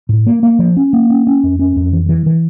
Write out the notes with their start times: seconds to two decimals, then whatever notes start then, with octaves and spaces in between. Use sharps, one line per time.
0.09 A2
0.26 A#3
0.43 A#3
0.59 F3
0.77 C#4
0.93 A#3
1.10 C#4
1.27 C#4
1.43 F2
1.59 C#4
1.76 F2
1.93 E3
2.09 E3
2.26 E3